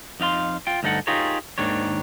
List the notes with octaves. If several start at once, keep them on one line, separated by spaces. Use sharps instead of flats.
F2 D#4 F5 C6
F4 G5
D2 G2 D#4 A4 F#5
D#4 F4 G4 G#4 A#4 C#5
D#2 G#2 D#3 D4 C#5